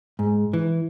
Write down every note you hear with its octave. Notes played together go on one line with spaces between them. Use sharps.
G#2
E3